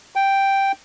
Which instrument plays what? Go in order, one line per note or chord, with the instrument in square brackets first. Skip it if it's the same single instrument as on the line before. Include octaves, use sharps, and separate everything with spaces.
[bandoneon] G5